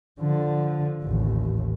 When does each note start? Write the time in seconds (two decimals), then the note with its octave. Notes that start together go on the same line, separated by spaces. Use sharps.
0.20 D3 F3
1.01 A1 D#2